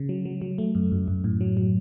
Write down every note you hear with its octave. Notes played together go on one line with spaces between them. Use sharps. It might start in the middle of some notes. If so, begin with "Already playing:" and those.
Already playing: C#3
F#3
F#3
F#3
A3
F#2
F#2
F#2
A2
F#3
F#3